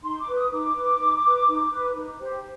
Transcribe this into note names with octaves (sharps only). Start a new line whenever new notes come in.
D#4 C6
D6
B4
D#6
D#4 D6
B4
D#4
B4
D#4
B4
D#4
G4 C5